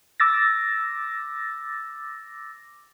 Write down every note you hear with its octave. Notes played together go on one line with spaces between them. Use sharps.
D6 E6 A6 A#6